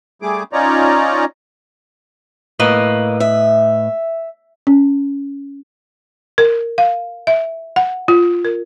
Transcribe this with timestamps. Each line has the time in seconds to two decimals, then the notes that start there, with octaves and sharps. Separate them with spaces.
0.22 G3 A3 G#4 D6
0.53 C#4 D#4 F4 C#5 D5 A#5
2.60 A2 A#3 B4 D#5
3.20 E5
4.67 C#4
6.38 A#4
6.78 F5
7.27 E5
7.76 F#5
8.08 F4
8.45 A#4